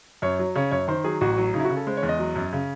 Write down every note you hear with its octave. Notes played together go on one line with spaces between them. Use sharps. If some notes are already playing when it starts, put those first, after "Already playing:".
F#2 C#5
F#3
C#3 C#5
F#2 C#5
D#3 C5
F#3 G#4
A1 F#4
F#3
C#3 D#4
E4
F#4
C#3
A4
G#3 C5
C#5
E2
D#5
F#3
F#2
C#3